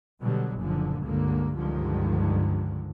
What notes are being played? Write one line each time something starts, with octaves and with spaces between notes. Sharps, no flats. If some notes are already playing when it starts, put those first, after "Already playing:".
B2 D3 F#3 G3
F#1 A#2 D3 F3
C#2 G2 D3 A#3
C#2 G2 D3 D#3 F3